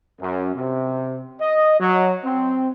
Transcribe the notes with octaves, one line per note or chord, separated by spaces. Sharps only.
F#2
C3
D#5
F#3
C4